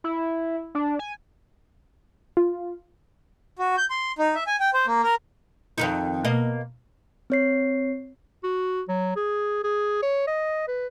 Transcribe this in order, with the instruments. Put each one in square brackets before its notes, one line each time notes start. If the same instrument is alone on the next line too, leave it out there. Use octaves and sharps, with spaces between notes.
[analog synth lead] E4
D4
G#5
[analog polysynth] F4
[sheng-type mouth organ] F#4
G6
C6
D#4
E5
G#5
G5
C5
A#3
A#4
[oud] F2 D#3 D#4
B2 A#3 D#5
[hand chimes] C4 C#5 C7
[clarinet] F#4
F#3
G#4
G#4
C#5
D#5
B4